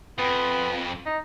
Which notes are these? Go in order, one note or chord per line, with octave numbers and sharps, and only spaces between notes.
F2 B3
D#4